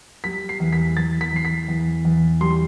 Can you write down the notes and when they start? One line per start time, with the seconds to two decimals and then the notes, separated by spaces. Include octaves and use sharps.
0.24 G3 B6
0.49 C7
0.60 E2
0.73 B6
0.97 E2 A6
1.21 B6
1.33 E2 C7
1.45 B6
1.68 E2
2.05 E2
2.41 G3 C6